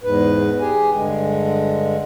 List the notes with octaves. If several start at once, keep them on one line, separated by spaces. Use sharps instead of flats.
E2 G#2 B4
G4 G#4 G#5
G2 D3 G#3